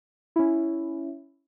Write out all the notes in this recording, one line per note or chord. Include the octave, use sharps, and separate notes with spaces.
C#4 E4